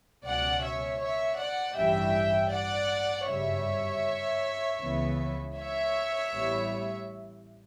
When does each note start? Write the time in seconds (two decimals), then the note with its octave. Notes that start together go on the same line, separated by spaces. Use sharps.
0.25 C#2 B2 F#3 C#4 D5 F#5
0.63 C#5 E5
1.01 C#5 E5
1.39 D5 F#5
1.76 A1 G2 E3 G3 C#4 E5 G5
2.53 D5 F#5
3.28 G1 F#2 C#3 G3 C#5 E5
4.81 C#2 C#3 E3 B3
5.57 C#5 E5
6.32 A1 A2 G3 B3